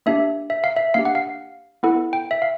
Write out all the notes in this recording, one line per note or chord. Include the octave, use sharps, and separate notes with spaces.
A#3 D4 G4 E5
E5
F5
E5
A#3 D4 G4 F5
F#5
F5
B3 E4 A4 F#5
G5
E5
F5